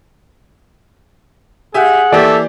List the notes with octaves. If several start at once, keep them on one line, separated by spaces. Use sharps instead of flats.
G4 G#4 E5 F#5 G#5
E3 A#3 G4 A4 D5 E5